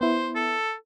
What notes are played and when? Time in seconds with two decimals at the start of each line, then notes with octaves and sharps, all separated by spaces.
0.01 B3 E4 C5
0.35 A4